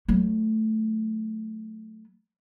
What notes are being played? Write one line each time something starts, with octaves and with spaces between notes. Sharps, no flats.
F#3 A3